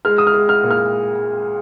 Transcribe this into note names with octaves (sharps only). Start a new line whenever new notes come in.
G#3 F6
D#6
F6
G#3
F6
A#2
F6